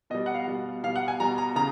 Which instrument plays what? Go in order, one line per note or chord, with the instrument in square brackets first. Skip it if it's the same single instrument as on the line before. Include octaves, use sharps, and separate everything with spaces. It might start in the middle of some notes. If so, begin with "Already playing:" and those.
[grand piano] B2 D#5
G3
F#5
F5
B2 G3
B2 G3 F5
F#5
G#5
B2 G3 A#5
A#5
C#3 A#5